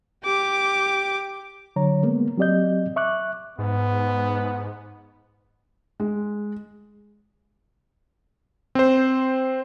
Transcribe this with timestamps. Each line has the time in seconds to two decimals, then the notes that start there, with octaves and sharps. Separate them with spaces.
0.24 G4 D6
1.76 D3 F#3 C#5 A#5
2.03 G#3 A#3 B3
2.37 F#3 C4 G4 D5 D#5 G6
2.96 E5 C#6 D6 F#6
3.58 G#2 B3
6.00 G#3
8.75 C4 C5